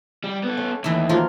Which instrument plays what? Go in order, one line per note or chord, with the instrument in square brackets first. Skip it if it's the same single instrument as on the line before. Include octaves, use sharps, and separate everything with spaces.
[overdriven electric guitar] G3
B3 A4
[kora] C#4
[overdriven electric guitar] D#2 [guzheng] E3 A3
[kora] F3 F#3 A#3 [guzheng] F4 A#4